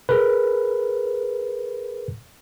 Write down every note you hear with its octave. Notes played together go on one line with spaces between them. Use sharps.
G#4 A#4 B4